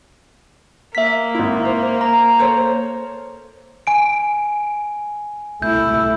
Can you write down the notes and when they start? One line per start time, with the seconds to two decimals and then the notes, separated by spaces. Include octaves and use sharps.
0.95 A#3 E5 B6
1.35 G#1 E4
1.65 C5
2.01 A#5
2.39 A4 C5 C#5
3.87 G#5 D7
5.62 A3 E4 G6